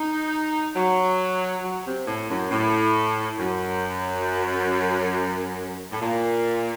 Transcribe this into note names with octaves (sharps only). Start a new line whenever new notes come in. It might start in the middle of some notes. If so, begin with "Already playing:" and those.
Already playing: D#4
F#3
F#3
C3
A2
F#2
A2
F#2
A2
A#2